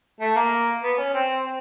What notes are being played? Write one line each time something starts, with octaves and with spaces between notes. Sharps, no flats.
A3
A#3
B3
C#4
C4
C4